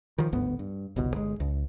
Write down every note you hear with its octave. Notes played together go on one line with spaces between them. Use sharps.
D#3 F3
G1 D2 G#2 B3
G2
G1 C2 B2
G1 G#3
C#2